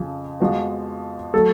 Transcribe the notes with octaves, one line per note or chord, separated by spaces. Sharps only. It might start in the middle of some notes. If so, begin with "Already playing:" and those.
Already playing: F2 C#3 F3
F2 F3 G#3 B3 F#4
F#3 A3 A4